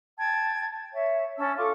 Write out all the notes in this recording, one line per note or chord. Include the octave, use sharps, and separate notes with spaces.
G5 A5 G#6
C#5 E5
C#4 A5 E6
F4 A4 C#6 D6